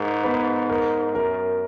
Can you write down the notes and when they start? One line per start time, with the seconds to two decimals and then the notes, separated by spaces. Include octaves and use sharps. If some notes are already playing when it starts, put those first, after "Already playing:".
Already playing: G#2 A#4
0.24 B3 B4
0.69 A#4
1.14 F#2 A#4